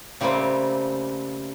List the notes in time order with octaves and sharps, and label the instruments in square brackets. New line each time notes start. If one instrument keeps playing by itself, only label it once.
[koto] C#3 G3 A3 A#3 C4